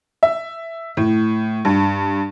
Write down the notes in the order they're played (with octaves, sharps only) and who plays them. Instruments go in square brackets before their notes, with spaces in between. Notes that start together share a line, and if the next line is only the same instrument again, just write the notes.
[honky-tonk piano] E5
A2
G2